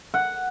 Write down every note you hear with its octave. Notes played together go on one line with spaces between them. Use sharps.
F#5